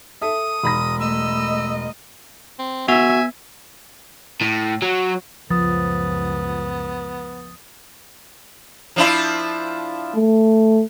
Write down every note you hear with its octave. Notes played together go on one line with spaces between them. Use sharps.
A4 E5 D#6
E1 B5 A#6
A3 D#5 E6
C4
B3 F#4 E5 G#5
A2
F#3
C#2 F#2 F3 B3 D#6 A6
F3 D4 E4
A3